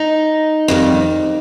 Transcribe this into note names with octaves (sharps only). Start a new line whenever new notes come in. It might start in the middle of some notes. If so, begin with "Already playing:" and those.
Already playing: D#4
F2 D#3 G3